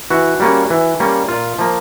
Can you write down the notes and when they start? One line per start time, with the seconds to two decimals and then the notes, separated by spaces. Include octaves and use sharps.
0.10 E3 F#4
0.40 G3 A#3 C#4
0.70 E3
1.00 G3 A#3 C#4
1.28 A#2 F4
1.59 F3 A#3